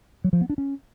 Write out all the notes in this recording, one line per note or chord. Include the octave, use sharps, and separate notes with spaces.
F#3
F3
B3
D4
C#4